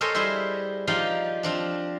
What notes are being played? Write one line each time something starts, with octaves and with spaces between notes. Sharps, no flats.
A4 A#4 C5 C#5 D#5 G#5
G3 E4 G#4 C5 E5
F3 D#4 G4 D5 F5
F3 C4 D4